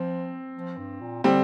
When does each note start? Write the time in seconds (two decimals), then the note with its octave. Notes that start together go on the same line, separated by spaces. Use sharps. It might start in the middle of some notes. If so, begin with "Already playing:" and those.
Already playing: F3 C4
0.54 F3
0.78 G2
1.01 A#2
1.24 D3 G3 C4